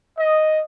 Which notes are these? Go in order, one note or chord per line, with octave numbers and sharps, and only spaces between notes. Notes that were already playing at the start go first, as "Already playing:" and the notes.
D#5